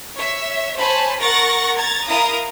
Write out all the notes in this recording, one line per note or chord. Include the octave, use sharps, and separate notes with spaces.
C#5 E5
C5 C#5 G#5 A5 B5
A#4 F#5 C#6 A6 A#6
A#5 G#6 A6
E4 A#4 F5 A#5 D#6